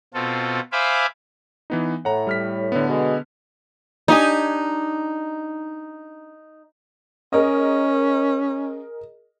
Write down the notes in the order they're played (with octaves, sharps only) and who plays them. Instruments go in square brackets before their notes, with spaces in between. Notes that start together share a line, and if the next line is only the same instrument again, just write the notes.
[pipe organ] B2 C4 F4 A4
C5 E5 F5 G#5 B5 D6
[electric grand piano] E3 B3 D#4
[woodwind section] A2 [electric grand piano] F#5 A#5
[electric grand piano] G3 F6 B6
D3 B3
[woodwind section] B2 G#3
[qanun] D4 G4 G#5 [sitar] D#4
[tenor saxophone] C#4 [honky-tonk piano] G#4 A#4 D#5